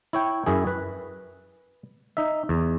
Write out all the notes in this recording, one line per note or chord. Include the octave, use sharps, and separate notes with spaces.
E4 C#5 G5
F#2 E4 G#4
B4
D#4 E5
E2